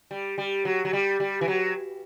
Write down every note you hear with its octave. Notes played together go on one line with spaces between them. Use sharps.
G3
G3
F#3
F#3
G3
G3
E3
F#3